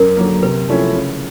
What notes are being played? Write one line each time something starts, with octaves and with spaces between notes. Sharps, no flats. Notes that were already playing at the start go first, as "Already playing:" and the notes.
Already playing: F#2 A#4
D3 F#3 A#3
C3 B4
F3 A3 C#4 E4
C#3